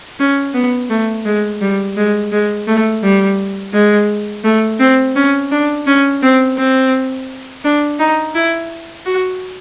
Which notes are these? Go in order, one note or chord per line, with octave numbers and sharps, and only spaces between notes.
C#4
B3
A3
G#3
G3
G#3
G#3
A3
G3
G#3
A3
C4
C#4
D4
C#4
C4
C4
D4
D#4
E4
F#4